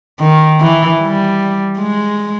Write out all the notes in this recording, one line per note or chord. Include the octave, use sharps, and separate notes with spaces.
D#3
E3
G3
G#3